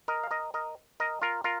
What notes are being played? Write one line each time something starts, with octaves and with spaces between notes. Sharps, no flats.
A#4 D#5
F5
A#4 D#5
A#4 D#5
A#4 D#5
F4 A#4
F4 A#4